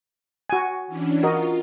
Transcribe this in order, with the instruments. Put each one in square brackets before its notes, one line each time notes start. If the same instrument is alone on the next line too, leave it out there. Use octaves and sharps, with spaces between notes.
[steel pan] F#4 G#5
[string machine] E3 C#4 D4
[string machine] F4 [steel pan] F#4 A#4 D#5